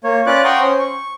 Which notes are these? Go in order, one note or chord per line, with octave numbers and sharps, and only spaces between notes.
A#3 C#5
C#4 F4 B4 D5 D6 F#6
F#5 G5 A#5 C6 C#6 D#6
C#4 C5
C#6